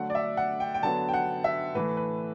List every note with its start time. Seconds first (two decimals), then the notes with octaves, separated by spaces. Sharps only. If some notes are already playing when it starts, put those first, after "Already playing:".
Already playing: D3 F#3 A3 F#5
0.10 D5
0.15 E5
0.37 F#5
0.60 G5
0.74 G5
0.83 D3 F#3 B3 A5
1.08 G5
1.14 F#5
1.44 E5
1.75 A2 E3 A3 B4
1.97 B4